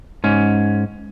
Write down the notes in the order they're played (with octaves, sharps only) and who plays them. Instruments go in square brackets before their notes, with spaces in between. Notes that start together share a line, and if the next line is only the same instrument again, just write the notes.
[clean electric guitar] G#2 C#4